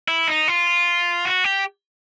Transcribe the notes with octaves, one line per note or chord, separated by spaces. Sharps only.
E4
D#4
F4
F#4
G4